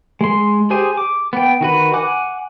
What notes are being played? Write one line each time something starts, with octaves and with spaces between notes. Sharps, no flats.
G#3 C6
G4 G#4 C5 G#5
D6
B3 G5
D#3 F#4 B4
F#5 G#5 D6 F#6